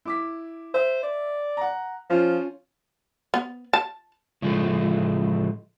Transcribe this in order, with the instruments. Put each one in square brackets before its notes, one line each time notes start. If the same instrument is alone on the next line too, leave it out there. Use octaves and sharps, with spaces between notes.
[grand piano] E4 D6 B6
[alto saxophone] C5 [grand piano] E5
[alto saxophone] D5
[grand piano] F#5 A#5
[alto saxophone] F3 [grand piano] C#4 F4
[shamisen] B3
A5
[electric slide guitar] A2 C#3 F3 G#3 A3